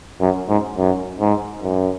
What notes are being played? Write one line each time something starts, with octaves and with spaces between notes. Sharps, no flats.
F#2
G#2
F#2
G#2
F#2